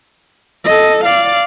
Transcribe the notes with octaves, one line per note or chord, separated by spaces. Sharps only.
A4 D#5
D5 F5